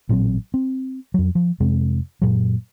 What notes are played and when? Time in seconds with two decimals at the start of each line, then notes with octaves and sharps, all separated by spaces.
0.09 A1 A#2 F#3 C4
0.54 C4
1.14 F2 F#3
1.35 F3
1.60 F2 C3 G#3 C4
2.22 F#2 A#2 F#3